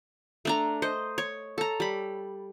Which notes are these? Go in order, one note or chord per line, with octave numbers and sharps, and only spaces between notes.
A3 D4 A#5
C5 D#5
C#5
A4 A#5
G3 B5